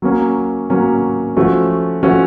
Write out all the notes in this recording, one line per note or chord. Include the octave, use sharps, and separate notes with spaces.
F#3 A#3 C#4
F#3 A#3 C#4
F3 A3 C#4 F#4
F3 A3 C#4 F#4